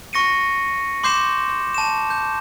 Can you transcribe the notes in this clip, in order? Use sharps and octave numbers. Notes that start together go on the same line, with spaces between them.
C#6 A#6 C#7 D#7
C6 D6 G6 C7 E7
A5 E7
G6